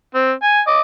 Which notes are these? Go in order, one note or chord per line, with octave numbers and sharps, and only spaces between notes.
C4
G#5
D#5 D6